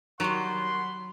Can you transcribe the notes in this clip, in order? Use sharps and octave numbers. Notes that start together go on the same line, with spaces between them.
D#3 F#3 G3 F#5 B5 C6